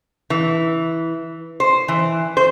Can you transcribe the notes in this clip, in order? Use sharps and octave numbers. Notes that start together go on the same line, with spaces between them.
E3
C5
E3
C5